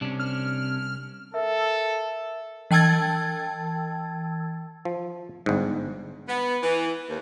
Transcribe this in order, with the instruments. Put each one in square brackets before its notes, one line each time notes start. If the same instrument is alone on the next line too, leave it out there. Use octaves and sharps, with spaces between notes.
[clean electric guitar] C2 C#4 [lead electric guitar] C3 D4
[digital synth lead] F6
[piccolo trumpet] A4 [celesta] A#4 E5
[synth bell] E3 G5 A5 E6 G#6 A6
[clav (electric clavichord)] F3
G1 G#2
[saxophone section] B3
E3
D#2